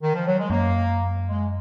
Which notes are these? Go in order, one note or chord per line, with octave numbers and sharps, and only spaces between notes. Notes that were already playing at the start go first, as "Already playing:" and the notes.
D#3
F3
F#3
G#3
F#2 A#3
G#3